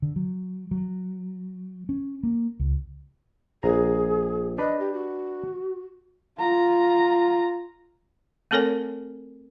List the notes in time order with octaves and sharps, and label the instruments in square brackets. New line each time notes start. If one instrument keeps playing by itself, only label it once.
[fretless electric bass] D3
F#3
F#3
C#4
A#3
C#2
[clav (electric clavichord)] A#1 A#5 [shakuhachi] G#4
[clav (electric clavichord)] D4 B4 [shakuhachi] D#5
[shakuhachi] G4
F#4
[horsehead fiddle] F4 A#5
[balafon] A3 C4 A4 A#4 C#5 G#5